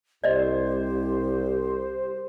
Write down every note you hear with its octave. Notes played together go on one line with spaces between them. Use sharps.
C2 G4 C5 D5 D#5